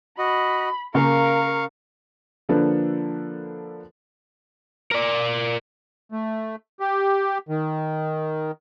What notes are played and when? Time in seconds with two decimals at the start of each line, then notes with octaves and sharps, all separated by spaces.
0.19 F#4 D#5 B5
0.94 C#3 A#3 A#4 F5 C#6
2.49 D3 F3 A#3 D4 A4 B4
4.91 A#4 D5
6.12 A3
6.80 G4
7.49 D#3